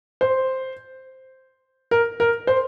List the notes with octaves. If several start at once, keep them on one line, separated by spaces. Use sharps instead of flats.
C5
A#4
A#4
C5